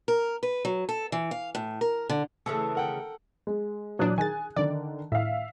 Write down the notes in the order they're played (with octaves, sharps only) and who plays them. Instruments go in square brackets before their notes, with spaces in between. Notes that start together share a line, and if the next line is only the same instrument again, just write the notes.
[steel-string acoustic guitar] A#4
B4
F#3
A4
E3
F5
A2
A#4
D3
[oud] C#3 E3 A3 [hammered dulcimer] A4
[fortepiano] A#4 F#5 G5
[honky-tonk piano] G#3
[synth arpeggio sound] A#2 E3 D4 [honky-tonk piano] F#3 D#6 F#6
[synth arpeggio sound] D#3 A6 [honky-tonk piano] G#4 G#5
[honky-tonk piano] D3 D#3 [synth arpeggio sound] D5
[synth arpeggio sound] A2 [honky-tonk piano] E5 F5